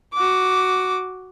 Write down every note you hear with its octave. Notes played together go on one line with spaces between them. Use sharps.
F#4 D6